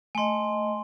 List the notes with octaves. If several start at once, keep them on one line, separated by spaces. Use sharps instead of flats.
A3 D#5 G#5 C6